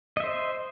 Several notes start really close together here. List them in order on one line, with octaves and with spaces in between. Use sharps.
D#5 E5 C5